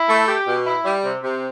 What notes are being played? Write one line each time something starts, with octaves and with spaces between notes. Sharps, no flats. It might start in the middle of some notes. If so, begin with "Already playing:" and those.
Already playing: E4
A3
G4
B2
E4
G3
C3
C3